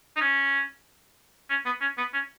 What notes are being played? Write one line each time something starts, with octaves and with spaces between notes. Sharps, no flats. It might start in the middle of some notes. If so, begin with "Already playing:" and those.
D#4
C#4
C#4
B3
C#4
B3
C#4